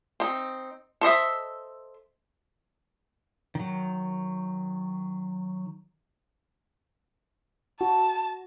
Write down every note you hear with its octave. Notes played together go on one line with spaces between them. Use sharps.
C4 D#4
A4 C5 D#5 E5
D#3 F#3
F#4 A5